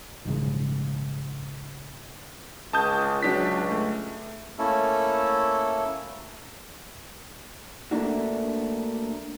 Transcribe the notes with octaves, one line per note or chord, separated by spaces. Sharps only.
A#1 G#2 C#3
C#2 A5 D#6 G6
C#2 F#3 D4 B6
A3
A3 A#3 C#4 E4 A4
A3 A#3 D4 F#4